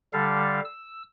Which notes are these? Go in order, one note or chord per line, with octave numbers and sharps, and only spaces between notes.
D3 G3 A4 F5
E6